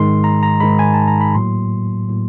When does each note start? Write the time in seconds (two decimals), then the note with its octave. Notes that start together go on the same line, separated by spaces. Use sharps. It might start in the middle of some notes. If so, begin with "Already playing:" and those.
Already playing: G#2 D#3 G#3 C6
0.24 A#5
0.43 A#5
0.60 G#2 D#3 G#3 B5
0.79 G#5
0.94 A5
1.08 A#5
1.21 B5
1.35 A2 F#3 A#3 C6
2.09 A2 F#3 A#3